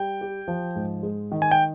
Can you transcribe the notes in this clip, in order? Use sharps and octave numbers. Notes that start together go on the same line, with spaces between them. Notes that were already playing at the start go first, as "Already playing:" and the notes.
Already playing: G3 G5
G4
F3
G#2
G#3
D#3
G#5
G5